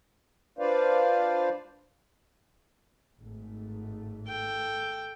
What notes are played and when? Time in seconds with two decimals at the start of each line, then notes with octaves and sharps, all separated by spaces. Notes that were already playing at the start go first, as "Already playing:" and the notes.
0.59 D4 F4 B4 C5 D5 F5
3.20 G#1 G#2 A3
4.27 A4 G5